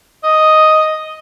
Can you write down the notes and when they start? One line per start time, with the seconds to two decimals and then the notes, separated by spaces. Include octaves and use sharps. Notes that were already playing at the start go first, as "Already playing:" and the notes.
0.23 D#5